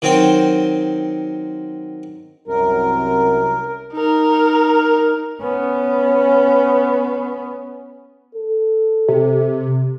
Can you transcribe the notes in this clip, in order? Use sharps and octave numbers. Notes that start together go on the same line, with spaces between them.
D#3 F#3 C4 C5 G5
C2 F#2 A#4
D#4 A#4
B3 C#4
A4
C3